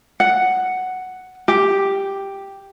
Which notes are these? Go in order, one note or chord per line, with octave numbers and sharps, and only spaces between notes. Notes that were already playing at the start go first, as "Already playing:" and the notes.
F#5
G4